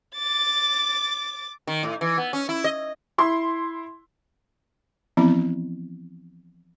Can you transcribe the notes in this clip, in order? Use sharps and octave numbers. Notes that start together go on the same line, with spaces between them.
D6 A6
D#3
A2
E3
B3
C#4
E4
D#5
E4 C6
E3 F3 B3 C4 E4